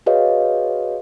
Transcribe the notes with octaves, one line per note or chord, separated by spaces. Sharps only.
F#4 G#4 B4 C#5 D#5 F5